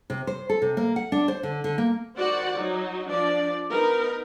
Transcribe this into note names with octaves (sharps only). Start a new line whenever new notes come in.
C3
C5
A4
C3
A#3
F#5
D4
C5
D3
D3
A#3
D#3 F#4 C5 D5 F#5
F#3 D#4
F3 D4 D5
B3 D#4 A#4